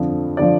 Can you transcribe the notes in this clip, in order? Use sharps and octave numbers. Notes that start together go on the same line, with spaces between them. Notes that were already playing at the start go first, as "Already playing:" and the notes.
Already playing: F2 D3 F3
D3 F3 D5